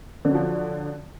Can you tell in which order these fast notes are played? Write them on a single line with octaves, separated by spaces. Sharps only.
D3 F#3 F3